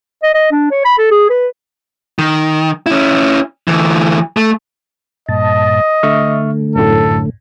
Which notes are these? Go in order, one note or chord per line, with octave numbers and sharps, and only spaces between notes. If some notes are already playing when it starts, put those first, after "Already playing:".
D#5
D#5
D4
C#5
B5
A4
G#4
B4
D#3
C#4 E4
D2 E3
A3
G2 A#2 D#5 A5
D3 A3 E5 C#6 F6
C2 F#2 A2 A4